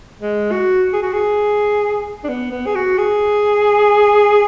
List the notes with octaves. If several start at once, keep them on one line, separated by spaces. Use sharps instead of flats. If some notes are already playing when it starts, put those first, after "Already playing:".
G#3
F#4
G#4
F#4
G#4
D4
B3
B3
G#4
F#4
G#4